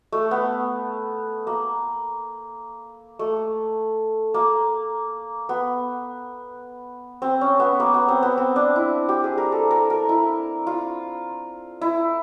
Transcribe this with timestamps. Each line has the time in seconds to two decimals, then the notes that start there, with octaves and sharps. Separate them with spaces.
0.12 A3
0.31 B3
1.47 A#3
3.19 A3
4.34 A#3
5.49 B3
7.22 C4
7.41 C#4
7.60 B3
7.80 A#3
7.94 B3
8.08 C4
8.23 B3
8.38 C4
8.56 D4
8.76 E4
9.09 G4
9.24 G#4
9.38 A#4
9.52 A4
9.71 A#4
9.90 A#4
10.09 E4
10.67 F4
11.81 E4